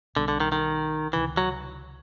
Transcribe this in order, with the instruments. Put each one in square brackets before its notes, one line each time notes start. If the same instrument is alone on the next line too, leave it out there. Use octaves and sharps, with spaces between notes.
[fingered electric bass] B1 B2 G3 [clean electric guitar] D3
[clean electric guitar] D3
D#3
D#3
[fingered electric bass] C#2 C3 D#3 [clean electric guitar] E3
[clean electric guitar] F#3